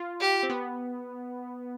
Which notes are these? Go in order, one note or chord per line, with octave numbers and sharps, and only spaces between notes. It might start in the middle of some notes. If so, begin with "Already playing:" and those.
Already playing: F4
G4
C4
B3